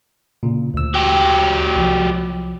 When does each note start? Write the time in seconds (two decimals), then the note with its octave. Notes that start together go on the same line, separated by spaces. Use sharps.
0.43 A#2 C#3
0.74 D2 E6
0.94 F#3 G4
1.76 C2 F3